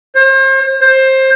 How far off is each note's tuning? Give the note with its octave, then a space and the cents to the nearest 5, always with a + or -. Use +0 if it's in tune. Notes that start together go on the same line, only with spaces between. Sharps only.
C5 +40
C5 +20